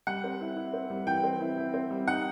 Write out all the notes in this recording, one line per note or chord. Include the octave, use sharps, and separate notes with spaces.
G3 F#5
C4
E4
E4
C4
G3
E3 G5
C4
E4
E4
C4
G3
D#4 F#5